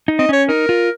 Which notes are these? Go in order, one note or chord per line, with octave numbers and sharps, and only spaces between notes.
D#4
C4 D#5
C#4 C#5
D#4 A#4
F4